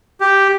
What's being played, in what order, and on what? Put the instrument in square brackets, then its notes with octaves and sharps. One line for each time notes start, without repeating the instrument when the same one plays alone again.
[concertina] G4